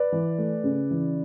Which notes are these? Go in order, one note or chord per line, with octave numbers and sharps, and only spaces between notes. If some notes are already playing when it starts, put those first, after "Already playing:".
Already playing: B4 D5
E3
A3
C#3
E3